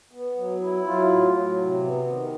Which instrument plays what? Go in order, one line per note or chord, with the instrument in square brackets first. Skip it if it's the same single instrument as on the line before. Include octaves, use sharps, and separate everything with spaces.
[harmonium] B3
F#3
E4
F#3 F4
A2
F#3
C3
B3
D#3